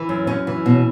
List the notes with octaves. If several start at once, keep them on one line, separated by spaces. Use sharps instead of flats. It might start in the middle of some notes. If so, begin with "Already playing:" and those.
Already playing: E3
F#2
F#2 C#4
E3
B2